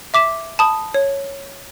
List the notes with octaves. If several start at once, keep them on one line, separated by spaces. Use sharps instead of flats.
E5 D6 B6 E7
A5 B5 D#6
C#5